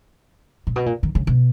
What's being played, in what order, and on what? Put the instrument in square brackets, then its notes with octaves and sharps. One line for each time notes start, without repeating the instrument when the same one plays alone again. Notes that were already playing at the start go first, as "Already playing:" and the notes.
[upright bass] A#2
B2
A#2
D#3
C#3
B2